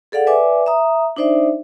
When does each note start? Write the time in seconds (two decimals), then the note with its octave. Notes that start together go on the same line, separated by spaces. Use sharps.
0.12 G#4 A4 D5 F5 F#5
0.27 B4 D5 E5 G#5 D6
0.66 E5 A#5 D#6
1.16 D4 D#4 C5 D5 E5